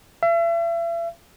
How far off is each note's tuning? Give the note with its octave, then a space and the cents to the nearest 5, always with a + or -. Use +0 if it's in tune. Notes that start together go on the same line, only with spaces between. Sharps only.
E5 +40